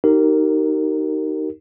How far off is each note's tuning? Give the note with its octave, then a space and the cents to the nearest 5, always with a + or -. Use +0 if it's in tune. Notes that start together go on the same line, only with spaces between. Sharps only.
D#4 +0 G4 -35 A#4 -20